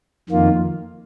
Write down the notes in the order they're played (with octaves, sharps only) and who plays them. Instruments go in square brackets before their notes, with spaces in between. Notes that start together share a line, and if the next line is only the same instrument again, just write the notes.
[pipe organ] F2 D#3 A#3 F4